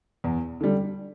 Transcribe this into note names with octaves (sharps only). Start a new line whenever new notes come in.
E2
D3 G3